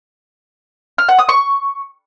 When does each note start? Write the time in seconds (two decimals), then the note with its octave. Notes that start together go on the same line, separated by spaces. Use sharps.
0.98 F6
1.08 F#5
1.19 D#6
1.29 C#6